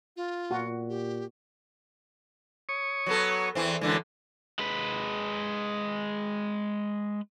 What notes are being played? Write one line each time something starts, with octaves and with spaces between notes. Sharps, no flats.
F4
A#2 F#4
G4
C#5 C#6 D#6
F#3 B3 A4
E2 E3 C4
F#2 D3 E3 G#3
G#3 B4